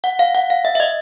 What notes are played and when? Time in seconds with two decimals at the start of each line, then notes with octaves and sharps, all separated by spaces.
0.04 F#5
0.19 F5
0.35 F#5
0.50 F5
0.65 E5
0.75 E5
0.80 D#5